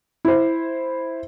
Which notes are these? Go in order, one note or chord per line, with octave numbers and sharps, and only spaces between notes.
E4 C5